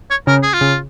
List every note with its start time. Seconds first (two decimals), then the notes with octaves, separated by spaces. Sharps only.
0.11 C#5
0.27 C#3 A#4
0.43 G#4
0.53 F4
0.61 C#3